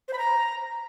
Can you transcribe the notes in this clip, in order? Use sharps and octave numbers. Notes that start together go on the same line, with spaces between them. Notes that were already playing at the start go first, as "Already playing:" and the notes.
C5
B5
A#5